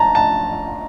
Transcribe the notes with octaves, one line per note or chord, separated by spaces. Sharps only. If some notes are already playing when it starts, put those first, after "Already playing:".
Already playing: A5 A#5
A5